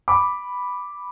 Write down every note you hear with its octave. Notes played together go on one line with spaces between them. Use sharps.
B5 D6